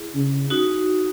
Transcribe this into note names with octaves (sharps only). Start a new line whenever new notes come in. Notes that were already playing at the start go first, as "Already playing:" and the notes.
Already playing: E4 G#4
C#3
D#4 F#4